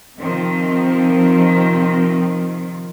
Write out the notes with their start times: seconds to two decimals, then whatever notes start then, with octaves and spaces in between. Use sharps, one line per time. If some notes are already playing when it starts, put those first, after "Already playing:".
0.18 C3 D#3 F3 C4